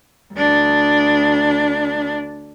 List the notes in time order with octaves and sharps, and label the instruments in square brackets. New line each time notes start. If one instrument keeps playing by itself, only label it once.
[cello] D2 D4